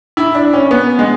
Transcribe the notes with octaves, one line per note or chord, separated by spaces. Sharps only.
E4
D4
C#4
B3
G#3